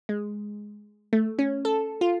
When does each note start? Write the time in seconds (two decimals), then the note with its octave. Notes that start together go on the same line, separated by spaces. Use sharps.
0.09 G#3
1.13 A3
1.39 C#4
1.65 A4
2.01 F4